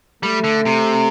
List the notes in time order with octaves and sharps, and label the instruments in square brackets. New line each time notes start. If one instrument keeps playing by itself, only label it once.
[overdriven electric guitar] G3 [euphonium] A3
[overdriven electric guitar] D3
C3